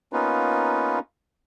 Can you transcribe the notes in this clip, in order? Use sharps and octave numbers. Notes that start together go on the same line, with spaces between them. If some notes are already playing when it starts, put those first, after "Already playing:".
A#3 B3 C#4 D#4 F4 B4